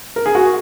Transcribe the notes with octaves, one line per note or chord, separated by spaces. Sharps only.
A#4
G#4
F#4